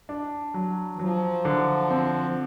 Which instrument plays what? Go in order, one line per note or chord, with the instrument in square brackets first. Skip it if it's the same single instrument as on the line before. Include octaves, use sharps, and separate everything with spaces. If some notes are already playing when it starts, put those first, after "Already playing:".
[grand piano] D4
F#3
[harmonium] E3
[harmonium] F3 [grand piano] F#3
[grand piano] D3
C4